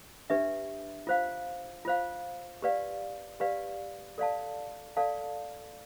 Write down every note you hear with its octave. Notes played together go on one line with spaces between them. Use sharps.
D4 G4 B4 E5
F4 C5 F5
F4 C5 F5
G4 B4 D5 F5
G4 B4 D5 F5
A4 D5 F5 A5
A4 D5 F5 A5